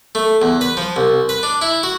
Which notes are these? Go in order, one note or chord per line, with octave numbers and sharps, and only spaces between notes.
A3
E2
B4
F3
C2
B4
D4
E4
F#4